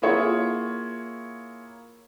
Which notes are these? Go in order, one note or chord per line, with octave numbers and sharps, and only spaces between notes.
A#3 E4 F4 G#4 C#5 F#5